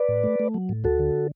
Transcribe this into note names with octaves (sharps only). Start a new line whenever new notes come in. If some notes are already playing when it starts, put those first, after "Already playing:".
Already playing: B4 D5
A2
A3
A3
F#3
A2
D2 F#4 A4
D3